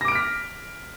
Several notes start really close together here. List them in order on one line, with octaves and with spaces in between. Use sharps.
A#6 D6 D7 F6 B6